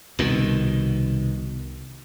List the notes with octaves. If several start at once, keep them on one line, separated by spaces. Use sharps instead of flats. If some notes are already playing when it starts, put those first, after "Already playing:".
C2 B2 D#3